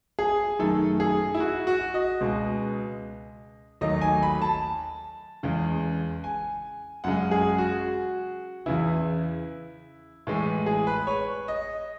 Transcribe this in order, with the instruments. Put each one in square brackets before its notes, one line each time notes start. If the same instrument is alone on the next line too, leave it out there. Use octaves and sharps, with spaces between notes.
[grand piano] G#4
F#2 D#3 A3 A4
G#4
E4
F#4
F#4
D#5
C#2 B2 G#3
D#2 D#3 F#3 A3 D#5
G#5
B5
A5
E2 C#3 G#3
G#5
F#2 C#3 G#3 F#5
G#4
F#4
E2 C#3 E3 E4
A2 E3 G#3
G#4
B4
C#5
D#5